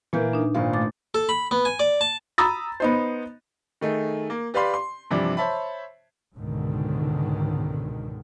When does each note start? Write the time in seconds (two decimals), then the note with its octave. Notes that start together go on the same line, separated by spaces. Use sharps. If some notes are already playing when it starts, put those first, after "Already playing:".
0.13 A#2 E3 A#3 B4 G6
0.33 D4 D#4
0.54 G#1 A#2 F4
0.73 A3 D6 A6
1.15 A4
1.29 B5
1.51 B3
1.65 G#5
1.80 D5
2.01 A5
2.38 A#5 B5 D#6 E6 A6
2.80 B3 D#4 C5
3.81 D#3 A3 D#4 G#4
4.30 A#3
4.54 G4 B4 D5 F5 B5 C6
4.74 C6
5.11 G2 C3 E3 F3 D4
5.37 C5 C#5 E5 A5 B5
6.37 C#2 G#2 B2 D3 D#3